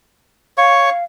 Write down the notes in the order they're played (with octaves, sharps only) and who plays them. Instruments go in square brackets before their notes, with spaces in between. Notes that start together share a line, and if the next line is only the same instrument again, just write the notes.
[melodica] C#5 C#6 [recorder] F5